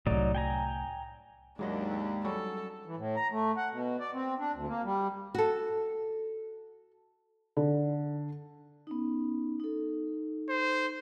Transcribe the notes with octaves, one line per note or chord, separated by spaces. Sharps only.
C2 A2 F#3 D#4 D5
G5 G#5 A#5
D#2 G#2 F#3 G#3 D4 D#5
C4
F#3 G3 C#4 A4
E3
A2
A#5
A3
F#5
B2
D5
C4
D4
D2
A#3
G3
F#4 A4
D3
B3 C#4 D#4
D#4 A4
C5